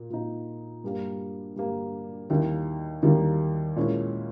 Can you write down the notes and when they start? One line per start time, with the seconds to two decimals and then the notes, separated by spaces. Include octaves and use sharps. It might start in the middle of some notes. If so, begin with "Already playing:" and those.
Already playing: A#2 A#3
0.10 A#2 A#3 D#4
0.84 G2 G3 A#3
1.56 G2 G3 A#3
2.30 D#2 D#3 G3 A#3 E4
3.03 D#2 D#3 G3 A#3 E4
3.76 A#2 G#3 C#4 E4